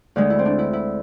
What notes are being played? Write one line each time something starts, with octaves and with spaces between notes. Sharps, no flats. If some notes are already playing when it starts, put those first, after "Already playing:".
D2 D3 G#3 D4
E4
C4
D4
E4
E4